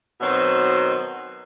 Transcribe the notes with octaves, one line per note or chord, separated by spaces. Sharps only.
B2 D#3 F#3 C4